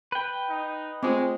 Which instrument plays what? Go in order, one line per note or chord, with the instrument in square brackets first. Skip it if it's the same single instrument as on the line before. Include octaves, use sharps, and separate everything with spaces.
[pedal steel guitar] B4 G5
[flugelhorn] D#4
[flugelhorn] G#3 [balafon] A3 F4 D6 [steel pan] C4